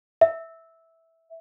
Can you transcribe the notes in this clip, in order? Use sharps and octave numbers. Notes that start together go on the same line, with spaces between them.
E5